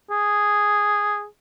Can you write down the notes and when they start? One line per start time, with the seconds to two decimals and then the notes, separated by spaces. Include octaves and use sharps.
0.10 G#4